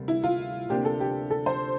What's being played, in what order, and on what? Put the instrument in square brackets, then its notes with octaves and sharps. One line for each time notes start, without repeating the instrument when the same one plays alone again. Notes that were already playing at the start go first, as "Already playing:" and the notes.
Already playing: [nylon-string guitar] D2 C3 G3 A#3
[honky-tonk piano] E4
F4
[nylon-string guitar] D2 C3 F3 A#3 D4 [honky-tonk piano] G4
[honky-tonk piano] A4
G4
A4
C5